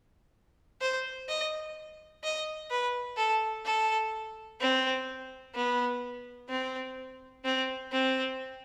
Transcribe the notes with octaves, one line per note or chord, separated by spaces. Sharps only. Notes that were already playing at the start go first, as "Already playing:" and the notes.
C5
D#5
D#5
B4
A4
A4
C4
B3
C4
C4
C4